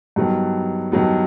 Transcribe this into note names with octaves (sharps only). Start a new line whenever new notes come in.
G2 D#3 F#3 B3
G2 D#3 F#3 B3